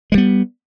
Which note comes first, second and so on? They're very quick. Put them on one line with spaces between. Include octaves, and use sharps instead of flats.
G#3 G3 B3